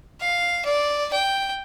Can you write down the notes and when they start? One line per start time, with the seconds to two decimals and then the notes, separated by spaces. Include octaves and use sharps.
0.21 F5
0.65 D5
1.13 G5